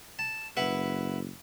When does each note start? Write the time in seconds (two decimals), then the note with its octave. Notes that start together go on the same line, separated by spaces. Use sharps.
0.19 A5
0.57 F#1 E4 B4 F#5